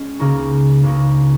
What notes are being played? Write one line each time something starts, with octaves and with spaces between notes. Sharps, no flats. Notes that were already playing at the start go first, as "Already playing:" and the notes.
Already playing: G#3 C#4
C#2 C#3 A#3 D#4 F#4
C#2 C#3 A#3 D#4 F#4